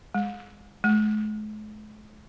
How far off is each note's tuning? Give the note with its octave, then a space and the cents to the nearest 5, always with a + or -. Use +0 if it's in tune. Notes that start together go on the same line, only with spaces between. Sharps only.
G#3 -20
G#3 +45